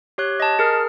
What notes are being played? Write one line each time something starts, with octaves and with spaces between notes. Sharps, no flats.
G4 C#5 F#6
D#5 A5
G#4 A#4 F6